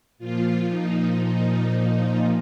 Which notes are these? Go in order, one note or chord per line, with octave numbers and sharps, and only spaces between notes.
A#2 F3 F4
D#4
D#4
D#4